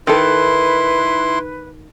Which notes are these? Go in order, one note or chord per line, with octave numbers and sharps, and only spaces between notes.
D#3 D#4 E4 A4 B4 C6